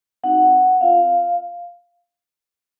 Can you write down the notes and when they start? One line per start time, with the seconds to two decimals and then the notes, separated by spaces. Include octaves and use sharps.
0.24 C4 D#4 F#4 F#5
0.81 C4 F4 F5